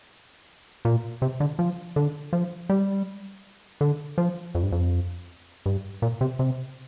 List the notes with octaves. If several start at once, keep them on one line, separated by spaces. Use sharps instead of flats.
A#2
C3
D3
F3
D3
F3
G3
D3
F3
F2
G2
F2
G2
A#2
C3
C3